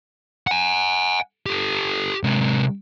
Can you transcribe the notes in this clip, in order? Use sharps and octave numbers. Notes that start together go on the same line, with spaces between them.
F#5 G#5
G4 A4
C3 G#3